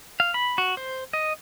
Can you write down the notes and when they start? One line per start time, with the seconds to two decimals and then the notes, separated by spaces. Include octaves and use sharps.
0.20 F5
0.34 B5
0.58 F#4
0.77 C5
1.13 D#5